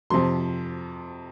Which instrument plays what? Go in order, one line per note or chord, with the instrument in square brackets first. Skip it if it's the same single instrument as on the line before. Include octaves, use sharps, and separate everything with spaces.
[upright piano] F2 C3 F3 C6